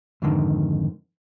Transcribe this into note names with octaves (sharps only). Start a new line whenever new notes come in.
F2 G#2 D3 D#3